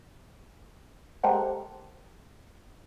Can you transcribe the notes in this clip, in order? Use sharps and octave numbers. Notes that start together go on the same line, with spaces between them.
G#3 G4 A4 A#4 C5 F#5